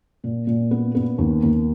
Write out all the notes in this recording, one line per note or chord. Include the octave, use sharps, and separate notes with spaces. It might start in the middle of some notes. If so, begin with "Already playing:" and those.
A#2
A#2
B3
B3
D#2
D#2